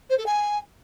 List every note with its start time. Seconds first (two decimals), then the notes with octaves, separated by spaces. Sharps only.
0.09 C5
0.18 A4
0.26 G#5